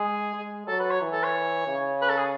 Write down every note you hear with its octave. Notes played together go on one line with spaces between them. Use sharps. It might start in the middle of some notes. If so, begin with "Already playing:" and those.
Already playing: G#3 G#4
G#3
F#3 A4
B4
C#5
E3
A4
C#5
C#3
B4
A4
G#4